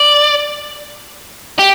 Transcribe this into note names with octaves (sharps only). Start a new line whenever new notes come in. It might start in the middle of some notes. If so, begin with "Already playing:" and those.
Already playing: D5
G4